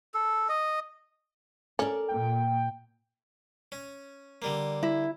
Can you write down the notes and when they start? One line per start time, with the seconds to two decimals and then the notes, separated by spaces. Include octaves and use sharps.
0.14 A4
0.49 D#5
1.79 C#4 A4 A#4 D5
2.08 A#2 G5
3.72 C#4
4.42 D3 G3 A#3
4.83 E4